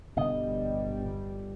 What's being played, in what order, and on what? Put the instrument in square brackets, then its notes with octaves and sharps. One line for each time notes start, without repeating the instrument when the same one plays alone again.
[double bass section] G1 G3 [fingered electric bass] B2 D3 [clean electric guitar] D#5